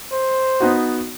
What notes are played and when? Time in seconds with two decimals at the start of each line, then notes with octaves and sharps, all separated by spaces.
0.12 C5
0.60 B3 D#4 F#4